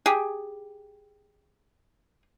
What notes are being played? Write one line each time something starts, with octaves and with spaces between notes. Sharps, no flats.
G4 G#4